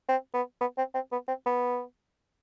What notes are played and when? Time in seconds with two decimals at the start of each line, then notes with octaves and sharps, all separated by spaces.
0.09 C4
0.34 B3
0.61 B3
0.78 C4
0.95 C4
1.12 B3
1.28 C4
1.46 B3